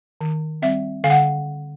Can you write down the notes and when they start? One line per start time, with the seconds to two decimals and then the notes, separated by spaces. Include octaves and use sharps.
0.21 D#3
0.62 G3 C4 E5
1.04 D3 F5
1.10 F#5